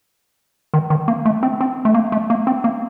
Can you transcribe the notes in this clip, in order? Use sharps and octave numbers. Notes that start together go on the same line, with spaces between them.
D#3
D#3
A#3
A3
C4
C4
A3
A#3
A3
A#3
C4
A#3